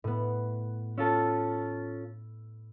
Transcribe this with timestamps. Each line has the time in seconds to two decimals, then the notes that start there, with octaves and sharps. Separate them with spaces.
0.04 A2 B3
0.98 C#4 F4 A4 E6